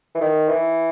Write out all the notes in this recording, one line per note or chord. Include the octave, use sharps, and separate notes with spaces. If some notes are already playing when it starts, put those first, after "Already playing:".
E3
D#3
E3